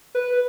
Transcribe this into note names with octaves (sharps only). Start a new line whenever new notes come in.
B4